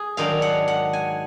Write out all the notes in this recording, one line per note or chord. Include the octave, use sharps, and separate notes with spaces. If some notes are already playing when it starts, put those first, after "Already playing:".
Already playing: G#4
G#2 D#3 F#3 D4 F5
F#5
F#5
G#5